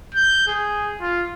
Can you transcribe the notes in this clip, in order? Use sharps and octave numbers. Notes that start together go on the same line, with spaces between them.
G6
G#4
F4